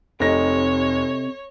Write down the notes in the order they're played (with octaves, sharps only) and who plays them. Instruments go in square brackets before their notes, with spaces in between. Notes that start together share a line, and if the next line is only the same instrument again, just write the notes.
[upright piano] F1 D#4 A#6 [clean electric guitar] C3 [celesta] A4 D#5 [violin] C#5